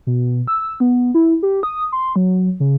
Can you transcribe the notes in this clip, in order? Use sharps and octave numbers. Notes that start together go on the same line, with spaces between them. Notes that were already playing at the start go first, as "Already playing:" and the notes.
B2
E6
B3
E4
G4
D#6
C6
F#3
C#3